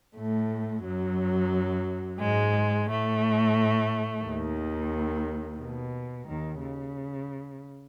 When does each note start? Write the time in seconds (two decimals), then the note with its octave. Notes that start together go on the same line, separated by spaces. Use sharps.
0.17 A2 A3
0.85 F#2 F#3
2.21 G#2 G#3
2.88 A2 A3
4.24 D#2 D#3
5.61 B2
6.28 D#2 D#3
6.61 C#3